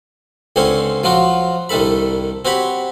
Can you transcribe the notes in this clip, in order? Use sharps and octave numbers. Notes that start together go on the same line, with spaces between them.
C#2 D3 C4 C#4 C5 C#5
F3 F#3 F4 F#4
C2 D#3 D4 A4 B5
C4 F#4 G4 C#5 B5